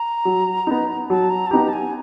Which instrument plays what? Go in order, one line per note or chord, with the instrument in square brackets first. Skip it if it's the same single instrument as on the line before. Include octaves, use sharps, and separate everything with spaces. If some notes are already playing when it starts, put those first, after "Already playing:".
Already playing: [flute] A#5
[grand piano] F#3
B3 D#4
[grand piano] F#3 [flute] A5
[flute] A#5
A5
[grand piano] B3 D#4 G4 [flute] A#5
[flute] A5
G#5